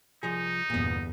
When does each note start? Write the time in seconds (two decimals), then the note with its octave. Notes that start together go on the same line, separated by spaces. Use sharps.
0.23 C2 F3 D#4 G#4
0.70 G1 E2 A#2 B3